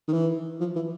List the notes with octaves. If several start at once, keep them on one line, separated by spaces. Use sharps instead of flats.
D#3
E3
F3
E3